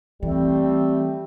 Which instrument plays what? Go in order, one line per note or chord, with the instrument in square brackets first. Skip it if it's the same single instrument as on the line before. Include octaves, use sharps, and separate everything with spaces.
[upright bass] E3 [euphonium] G3 [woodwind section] A3 C4